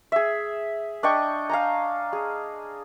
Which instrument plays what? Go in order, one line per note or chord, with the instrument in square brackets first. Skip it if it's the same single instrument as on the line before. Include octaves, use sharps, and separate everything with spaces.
[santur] G#4 E5
D4 D#5 G5 C#6
F5 G#5 A#5
G#4